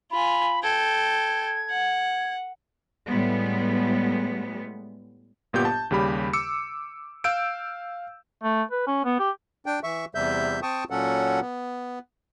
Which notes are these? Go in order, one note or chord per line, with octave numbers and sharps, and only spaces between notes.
F4 G#5 B5
A4 G5 G#6
F#5
A2 G3 G#3 B3
G1 A#2 B3 G4 G6
A5
D#2 C#3 G3 G4 B5
D6 E6 C#7
F5 E6 G6 D7
A3
B4
C#4
B3
G4
D4 G5
E3 E5 C#6
E2 C3 G3 E5 G6
C4 G5 A5 C#6 D#6
A#2 F#3 C#4 A4 F#5
B3